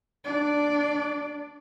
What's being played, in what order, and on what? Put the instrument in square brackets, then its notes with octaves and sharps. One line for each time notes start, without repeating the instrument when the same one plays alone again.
[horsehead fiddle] D4 D5